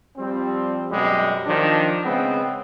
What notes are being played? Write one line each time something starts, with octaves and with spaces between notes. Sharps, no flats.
F3 G3 C4
F#2 B2 G3 G#3
D#3 F3 D4
C#3 G#3 B3 C4